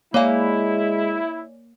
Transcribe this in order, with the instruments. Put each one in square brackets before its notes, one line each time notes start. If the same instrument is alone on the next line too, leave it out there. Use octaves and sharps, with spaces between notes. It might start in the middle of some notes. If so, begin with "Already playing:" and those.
[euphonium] G#3 [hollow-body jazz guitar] A#3 F5 [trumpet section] E4 [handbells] C#5 D5 G#5